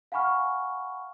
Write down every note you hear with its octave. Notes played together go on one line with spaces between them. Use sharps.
F5 F#5 G#5 B5 C#6 F6